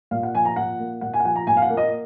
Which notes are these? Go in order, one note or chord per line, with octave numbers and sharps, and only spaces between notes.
A#2 F5
F#5
F3 G#5
A#5
A#2 F#5
A#3
A#2 F#5
G#5
F#5
F3 G#5
A#5
A#2 G#5
F5
F#5
A#3
D#5